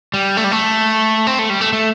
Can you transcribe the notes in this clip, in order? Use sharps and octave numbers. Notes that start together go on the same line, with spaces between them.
G3
A3
G3
A3
C4
A3
G3
A3
A3